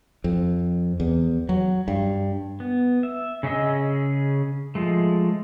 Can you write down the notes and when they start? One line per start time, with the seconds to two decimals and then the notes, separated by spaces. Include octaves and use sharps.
0.24 F2
1.00 E2
1.49 F#3
1.88 G2
2.60 B3
3.03 E5
3.43 C#3 C#4 G#4 D#5 E6
4.75 F3 G#3 A3